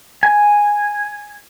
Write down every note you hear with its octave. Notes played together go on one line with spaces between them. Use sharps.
G#5